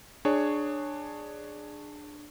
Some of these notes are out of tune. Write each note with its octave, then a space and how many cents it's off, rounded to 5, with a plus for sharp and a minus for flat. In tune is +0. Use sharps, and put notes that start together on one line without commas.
D4 +15 G#4 +0 C#5 +0